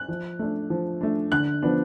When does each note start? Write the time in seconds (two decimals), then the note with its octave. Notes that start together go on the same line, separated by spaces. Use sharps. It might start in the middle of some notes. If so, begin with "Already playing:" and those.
Already playing: F#6
0.08 F3
0.39 A3 D4
0.70 F3
1.01 A3 D4
1.32 D3 F#6
1.62 F3 B3 D4